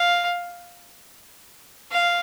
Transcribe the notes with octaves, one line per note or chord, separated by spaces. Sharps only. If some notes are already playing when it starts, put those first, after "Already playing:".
Already playing: F5
F5